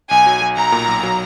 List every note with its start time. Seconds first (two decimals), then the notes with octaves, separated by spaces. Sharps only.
0.11 B1 G#5
0.26 F#3
0.42 F#3
0.57 B1 A#5
0.72 A#2
0.88 B1
1.03 F#3